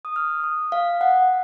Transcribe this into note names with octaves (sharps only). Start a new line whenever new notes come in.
D#6
F6
D#6
F5
F#5